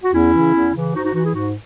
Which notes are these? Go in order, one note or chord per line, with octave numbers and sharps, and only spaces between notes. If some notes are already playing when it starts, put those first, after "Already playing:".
F#4
E2 C#4 E4
C#3 E3
E2
C#3 E3
G#2 D#4 F#4
D#4 F#4
E3 D#4 F#4
E4 G#4
G#2 D#4 F#4